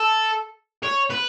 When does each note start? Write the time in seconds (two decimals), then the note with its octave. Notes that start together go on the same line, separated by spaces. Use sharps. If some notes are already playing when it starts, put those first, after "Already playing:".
Already playing: A4
0.83 C#5
1.10 B4